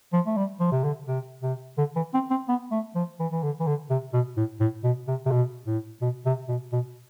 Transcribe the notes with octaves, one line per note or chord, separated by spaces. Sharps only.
F3
A3
G3
F3
C3
D3
C3
C3
D3
E3
C4
C4
B3
A3
F3
E3
E3
D3
E3
D3
C3
B2
A2
A2
B2
C3
C3
B2
A2
B2
C3
B2
B2